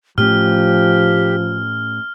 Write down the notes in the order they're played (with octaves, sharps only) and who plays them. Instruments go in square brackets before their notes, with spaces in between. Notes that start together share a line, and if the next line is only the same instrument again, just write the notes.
[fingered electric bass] A2 A3 C#4 [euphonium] F3 [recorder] G4 [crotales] F6